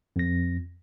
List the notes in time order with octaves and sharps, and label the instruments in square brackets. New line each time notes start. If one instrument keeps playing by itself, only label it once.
[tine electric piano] F2 A#6